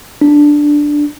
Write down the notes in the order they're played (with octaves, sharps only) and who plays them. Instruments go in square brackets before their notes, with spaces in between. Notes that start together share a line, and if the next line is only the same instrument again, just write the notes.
[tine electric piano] D4